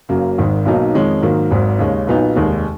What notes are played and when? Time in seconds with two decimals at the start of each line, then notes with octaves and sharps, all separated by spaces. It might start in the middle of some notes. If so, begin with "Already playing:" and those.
0.09 F#1 F#2 C#3 F#3 A#3
0.38 G#1 G#2 D#3
0.66 B1 B2 F#3 A#3 D#4
0.94 F2 D#3 G#3 C#4
1.22 G#2 D#3 F#3 A#3
1.51 G#1 G#2 F#3
1.79 D#2 C#3 G#3 C#4
2.07 B1 A#2 F#3 B3 D#4
2.36 F1 D#2 D#3 G#3